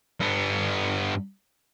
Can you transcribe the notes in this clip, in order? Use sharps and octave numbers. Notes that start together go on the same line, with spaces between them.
G2 B3